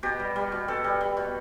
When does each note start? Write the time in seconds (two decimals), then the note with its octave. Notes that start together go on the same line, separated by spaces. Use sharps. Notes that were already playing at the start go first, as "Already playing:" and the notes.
0.03 B2 G4
0.19 G3
0.36 G3
0.52 B2
0.68 B2 A4
0.84 G3
1.01 G3
1.17 B2